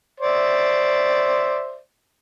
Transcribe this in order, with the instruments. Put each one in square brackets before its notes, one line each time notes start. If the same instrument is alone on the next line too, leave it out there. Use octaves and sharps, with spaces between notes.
[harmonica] C5 D5 E5